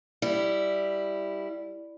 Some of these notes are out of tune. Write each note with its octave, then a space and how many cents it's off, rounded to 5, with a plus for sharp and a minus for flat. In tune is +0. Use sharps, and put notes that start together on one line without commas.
G3 +0 E4 +0